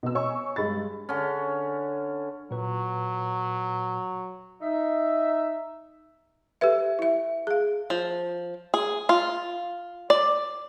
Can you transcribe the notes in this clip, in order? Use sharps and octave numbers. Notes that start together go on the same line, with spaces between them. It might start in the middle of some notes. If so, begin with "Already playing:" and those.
B2 E6
C#5 D#5 G#5 C#6
G2 G#3 B5 A6
D3 C#4
A#2 F#3 B4
D#4 E5
G4 A4 B4 E5
E4 E5
G#4 F5
F3
G#4
F4
D5